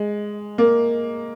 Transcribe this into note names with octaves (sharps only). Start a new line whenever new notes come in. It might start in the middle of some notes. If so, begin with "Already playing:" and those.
Already playing: G#3
A#3